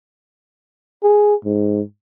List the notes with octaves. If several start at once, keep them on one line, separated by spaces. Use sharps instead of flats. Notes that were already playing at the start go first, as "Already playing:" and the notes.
G#4
G#2